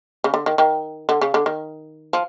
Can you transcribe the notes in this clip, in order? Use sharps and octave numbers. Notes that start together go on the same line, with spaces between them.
C#3
D3
D#3
D#3
D3
C#3
D3
D#3
F3